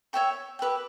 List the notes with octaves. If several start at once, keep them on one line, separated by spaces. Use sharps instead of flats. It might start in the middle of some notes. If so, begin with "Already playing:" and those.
C#5 E5 G5 C#6
G4 B4 E5 G5